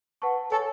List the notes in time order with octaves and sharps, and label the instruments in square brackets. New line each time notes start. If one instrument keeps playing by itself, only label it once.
[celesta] B4 F#5 A5 C#6
[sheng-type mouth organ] A4 [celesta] C#5 G#5 C#6